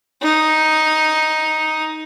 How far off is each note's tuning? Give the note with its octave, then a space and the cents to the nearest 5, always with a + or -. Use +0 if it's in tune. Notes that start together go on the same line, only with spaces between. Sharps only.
D#4 +5